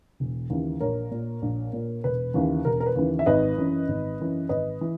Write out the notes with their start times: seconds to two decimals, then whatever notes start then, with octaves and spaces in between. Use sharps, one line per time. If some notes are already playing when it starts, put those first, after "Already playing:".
0.20 E1
0.50 D#2 C#3 E3
0.80 A#1 A#4 C#5
1.11 A#2
1.42 A#1
1.73 A#2
2.04 E1 B4
2.34 D#2 C#3 E3
2.65 E1 A#4
2.80 A#4
2.86 B4
2.95 D#2 C#3 E3
3.19 E5
3.26 G#1 B4 D#5
3.58 F#2 E3
3.88 G#1
4.20 F#2 E3
4.49 G#1 B4 D#5
4.81 E3